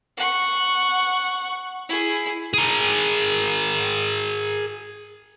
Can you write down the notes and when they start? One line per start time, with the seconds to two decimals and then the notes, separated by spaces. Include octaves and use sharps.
0.17 F#5 C#6
1.89 E4 G#4
2.54 G#4 A#4